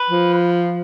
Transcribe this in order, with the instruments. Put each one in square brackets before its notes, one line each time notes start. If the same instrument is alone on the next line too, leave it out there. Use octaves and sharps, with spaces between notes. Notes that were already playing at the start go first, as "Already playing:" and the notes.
Already playing: [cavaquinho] B4
[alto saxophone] F3